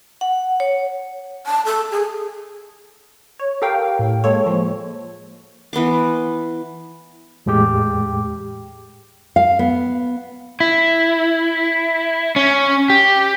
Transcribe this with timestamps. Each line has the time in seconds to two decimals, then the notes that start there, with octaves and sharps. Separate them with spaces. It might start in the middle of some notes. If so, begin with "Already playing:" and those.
0.21 F#5
0.60 C#5
1.46 A5
1.65 A4
1.91 G#4
3.39 C#5
3.62 G4 A4 A#4 F5 G5
3.99 A2
4.24 G#3 A#3 A4 C#5
4.46 F3 G#3
5.73 E3 B3 C6 D6
7.46 E2 A2 G#3 G4 G5 D6
9.36 F5
9.59 B3
10.60 E4
12.36 C#4
12.90 G4